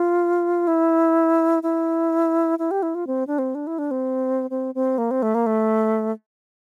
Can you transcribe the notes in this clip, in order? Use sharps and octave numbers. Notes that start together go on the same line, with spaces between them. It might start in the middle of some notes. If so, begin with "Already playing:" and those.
Already playing: F4
E4
E4
E4
G4
E4
F4
C4
D4
C4
D4
E4
D4
C4
C4
C4
A#3
C4
A3
A#3
A3